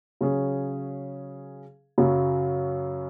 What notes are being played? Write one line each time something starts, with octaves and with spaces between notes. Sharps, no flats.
C#3 F#3 C#4 G#4
F#2 C#3 F#3